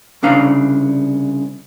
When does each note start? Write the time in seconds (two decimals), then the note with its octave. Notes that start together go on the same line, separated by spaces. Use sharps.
0.23 C2 C#3 D4 F5 A#5